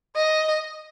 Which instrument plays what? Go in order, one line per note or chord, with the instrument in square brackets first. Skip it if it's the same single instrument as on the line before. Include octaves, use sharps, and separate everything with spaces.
[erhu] D#5